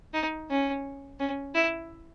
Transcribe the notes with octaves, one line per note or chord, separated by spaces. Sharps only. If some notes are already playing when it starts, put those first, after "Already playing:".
D#4
C#4
C#4
E4